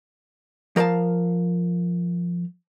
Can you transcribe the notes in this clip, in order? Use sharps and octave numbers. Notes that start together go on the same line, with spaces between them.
F3 A#4 D5 F5 A5